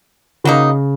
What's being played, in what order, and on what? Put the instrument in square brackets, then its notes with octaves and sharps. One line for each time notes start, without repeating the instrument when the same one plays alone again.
[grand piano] C#3 [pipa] F#3 A#3 D#4